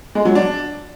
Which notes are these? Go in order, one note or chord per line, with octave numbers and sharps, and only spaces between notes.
G#3
F#3
D4